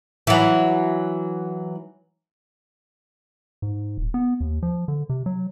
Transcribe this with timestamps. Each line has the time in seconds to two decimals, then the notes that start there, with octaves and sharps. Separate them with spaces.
0.27 E3 F#3
3.62 G#2
3.98 D#1
4.14 B3
4.41 D#2
4.63 F3
4.88 D3
5.10 C3
5.26 F#3